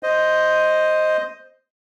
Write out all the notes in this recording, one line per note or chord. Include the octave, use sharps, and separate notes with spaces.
C5 D#5